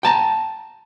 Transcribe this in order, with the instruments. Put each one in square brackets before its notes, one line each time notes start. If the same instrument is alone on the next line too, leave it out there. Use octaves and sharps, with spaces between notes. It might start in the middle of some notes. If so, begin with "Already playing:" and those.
[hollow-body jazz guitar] G5 A5 A#5